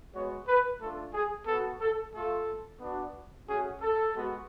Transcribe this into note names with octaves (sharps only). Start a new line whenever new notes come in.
G#3 B3 F#4 C#5
B4
A3 D4 F4 A4
G#4
B3 F#4 A4
A4
A3 F4 A4
B3 D4 F#4
A3 C#4 F#4 G#4
A4
G#3 B3 F#4